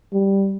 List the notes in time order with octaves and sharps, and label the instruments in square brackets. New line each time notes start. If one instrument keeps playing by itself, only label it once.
[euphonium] G3